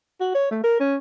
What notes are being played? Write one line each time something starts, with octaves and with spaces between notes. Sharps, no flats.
F#4
C#5
A3
A#4
C#4